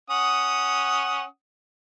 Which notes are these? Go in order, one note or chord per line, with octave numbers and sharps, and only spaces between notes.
C#4 F#5 D#6